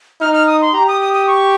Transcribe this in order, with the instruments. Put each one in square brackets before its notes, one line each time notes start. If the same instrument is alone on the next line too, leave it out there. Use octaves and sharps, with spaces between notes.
[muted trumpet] D#4 [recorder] F6
[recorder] F6
D#6
C6
[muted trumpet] G4 [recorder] A#5
[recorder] D#6
D#6
D#6
C#6